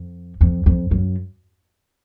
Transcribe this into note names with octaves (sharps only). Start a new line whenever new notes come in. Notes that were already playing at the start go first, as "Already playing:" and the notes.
Already playing: F2
F2
F2
F#2